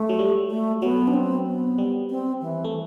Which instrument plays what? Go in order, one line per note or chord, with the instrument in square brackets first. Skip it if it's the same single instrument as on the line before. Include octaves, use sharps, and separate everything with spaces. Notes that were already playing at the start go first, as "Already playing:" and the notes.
Already playing: [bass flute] A3
[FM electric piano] F#3
G3
[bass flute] A3
[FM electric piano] F#3 [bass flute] B3
[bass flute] D4
C4
B3
[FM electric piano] G3
[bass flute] C4
E3
[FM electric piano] A3